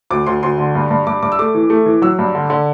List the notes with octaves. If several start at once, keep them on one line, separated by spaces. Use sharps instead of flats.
D2 D6
D2 C6
D2 C6
D3
G2
G2
G2 D6
G2 D6
E6
A3 D6
E3
A3
E3
F#3 E6
G2
D3
D3